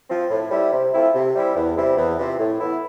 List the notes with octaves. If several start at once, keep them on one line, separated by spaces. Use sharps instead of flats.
F3 C4
A2
G3 C4 E4
C3
F3 A3 C4 E4
C3
G3 C4 E4
E2
C3 G3 C4 E4
E2
C3 F3 C4 E4
A2
E3 B3 E4